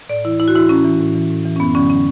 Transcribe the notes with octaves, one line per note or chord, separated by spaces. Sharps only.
A2 D5
E3 E4
A2 E4
F#4
E3 E4
A2 C#4
E3
A2
E3
A2
E3
C#4
F#2 B3
D3 F#3 C#4
C#4